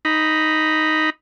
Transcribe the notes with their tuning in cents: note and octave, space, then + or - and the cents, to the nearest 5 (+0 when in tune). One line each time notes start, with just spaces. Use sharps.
D#4 +0 B5 +0